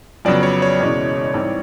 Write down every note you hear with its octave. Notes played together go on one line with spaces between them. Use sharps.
F2 C#3 F#3 B3 D5
C#5
C#5
F#1 E2 B2 G#3 C#4
A1 G#2 E3 G3 C4